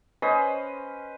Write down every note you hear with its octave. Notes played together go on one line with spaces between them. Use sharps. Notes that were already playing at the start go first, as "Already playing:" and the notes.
C#4 B4 C5 D#5